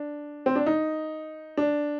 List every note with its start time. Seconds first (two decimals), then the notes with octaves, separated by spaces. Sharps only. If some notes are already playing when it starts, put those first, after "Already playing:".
Already playing: D4
0.46 C4
0.56 D4
0.66 D#4
1.57 D4